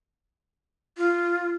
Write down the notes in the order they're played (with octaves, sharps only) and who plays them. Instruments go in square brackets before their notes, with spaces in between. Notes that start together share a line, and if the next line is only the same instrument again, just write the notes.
[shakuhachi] F4